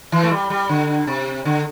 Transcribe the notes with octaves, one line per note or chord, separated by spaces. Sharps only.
E3
A3
G3
G3
D3
C3
D3